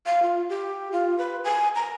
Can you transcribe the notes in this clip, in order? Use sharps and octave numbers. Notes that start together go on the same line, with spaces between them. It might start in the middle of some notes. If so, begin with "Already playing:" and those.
F5
F4
G4
F4
B4
G#5
A#5